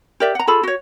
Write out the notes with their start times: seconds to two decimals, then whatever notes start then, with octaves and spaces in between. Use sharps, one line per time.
0.20 G4 A#4 D5 E5
0.35 F#5 A#5
0.47 F4 G#4 A4 B5
0.63 F#4 C#5